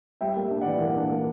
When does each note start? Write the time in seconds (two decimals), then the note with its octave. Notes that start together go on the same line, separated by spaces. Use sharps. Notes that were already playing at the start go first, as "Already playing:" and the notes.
0.21 G3 E5 G5
0.36 A#3
0.51 D4
0.61 E3 D5 F#5
0.81 A#3
0.97 D4
1.11 A#3